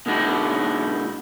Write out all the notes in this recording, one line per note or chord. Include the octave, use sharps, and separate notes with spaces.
B2 D3 G#3 D#4 E4 F#4